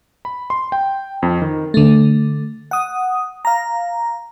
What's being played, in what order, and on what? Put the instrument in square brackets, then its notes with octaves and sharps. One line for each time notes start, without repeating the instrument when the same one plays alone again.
[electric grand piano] B5
C6
G5
F2
D#3
[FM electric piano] D3 A3
F#5 D#6
F5 A#5